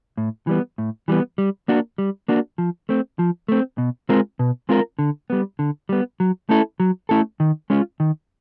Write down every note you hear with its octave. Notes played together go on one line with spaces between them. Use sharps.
A2
E3 G3 B3
A2
E3 G3 B3
G3
A#3 D4 F#4
G3
A#3 D4 F#4
F3
A3 C4
F3
A3 C4
B2
G#3 C4 F4 A#4
B2
G#3 C4 F4 A#4
D3
G3 B3
D3
G3 B3
F#3
A3 C#4 E4 A4
F#3
A3 C#4 E4 A4
D#3
G#3 C#4 F4
D#3